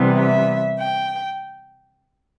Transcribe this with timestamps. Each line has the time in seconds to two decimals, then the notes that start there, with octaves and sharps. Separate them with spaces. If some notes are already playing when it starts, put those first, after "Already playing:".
Already playing: C3 E3 G3 B3
0.18 E5
0.78 G5